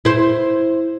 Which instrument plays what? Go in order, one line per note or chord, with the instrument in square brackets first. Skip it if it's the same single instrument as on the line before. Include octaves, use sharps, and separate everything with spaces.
[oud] E4 C5